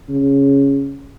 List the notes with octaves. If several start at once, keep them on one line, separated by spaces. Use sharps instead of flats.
C#3